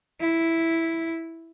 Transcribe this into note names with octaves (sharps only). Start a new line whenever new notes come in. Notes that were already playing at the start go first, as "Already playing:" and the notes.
E4